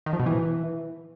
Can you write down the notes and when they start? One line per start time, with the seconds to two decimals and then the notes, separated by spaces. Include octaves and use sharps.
0.06 D#3
0.13 F3
0.20 B2
0.26 E3